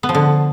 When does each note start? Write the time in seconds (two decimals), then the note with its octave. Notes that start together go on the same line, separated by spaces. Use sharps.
0.03 B3
0.09 F3
0.15 D3